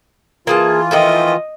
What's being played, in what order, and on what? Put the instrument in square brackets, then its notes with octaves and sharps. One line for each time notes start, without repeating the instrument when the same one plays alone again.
[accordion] E3 F4 [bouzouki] A#3 G#4 A5
[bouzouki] D#3 F3 A3 [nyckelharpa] D#5